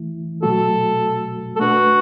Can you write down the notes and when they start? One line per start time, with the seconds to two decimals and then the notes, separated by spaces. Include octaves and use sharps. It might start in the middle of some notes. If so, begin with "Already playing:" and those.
Already playing: E3 A3 E4
0.43 B2 F#3 A3 F#4 A4
1.56 A4
1.60 A3 D4 F#4 B4